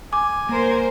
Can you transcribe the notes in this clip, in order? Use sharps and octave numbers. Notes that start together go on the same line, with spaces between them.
G#5 D6
A#3 A#4 C5